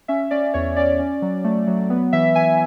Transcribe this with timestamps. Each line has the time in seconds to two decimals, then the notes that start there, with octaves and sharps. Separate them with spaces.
0.08 C#4 E5
0.31 C#4 D5
0.54 E2 C#5
0.76 C#4 D5
0.99 C#4
1.22 F#3
1.44 A3
1.67 F#3
1.90 B3
2.13 E3 E5
2.35 E3 G#5